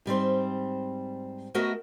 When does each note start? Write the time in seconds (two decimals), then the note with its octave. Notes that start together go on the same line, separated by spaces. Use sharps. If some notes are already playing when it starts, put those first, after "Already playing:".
0.06 G#2 G3 C4 C5
1.54 A3 B3 F#4 A#4 D#5 E5